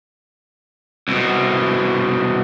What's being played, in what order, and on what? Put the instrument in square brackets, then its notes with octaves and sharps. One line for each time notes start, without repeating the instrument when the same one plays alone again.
[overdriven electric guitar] C2 B2